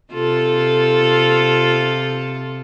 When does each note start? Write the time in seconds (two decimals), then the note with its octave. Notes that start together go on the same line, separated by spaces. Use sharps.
0.13 C3 F4 A4